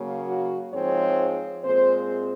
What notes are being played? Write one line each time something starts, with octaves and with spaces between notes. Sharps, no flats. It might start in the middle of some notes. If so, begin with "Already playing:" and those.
Already playing: C#3 F#3 A#3
F#4
G#2 F3 G#3 C4 C#5
A#2 G#3 C4 C5